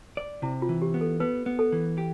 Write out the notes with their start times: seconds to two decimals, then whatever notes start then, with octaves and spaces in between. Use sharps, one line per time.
0.17 D5
0.42 C3 E4
0.62 F4
0.69 E3
0.82 G4
0.94 B3
1.01 A4
1.20 B3 B4
1.46 B3
1.59 A4
1.72 E3
1.98 G4